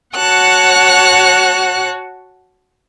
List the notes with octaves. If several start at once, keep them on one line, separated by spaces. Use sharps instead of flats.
F#4 C#5 F#5 A5 F#6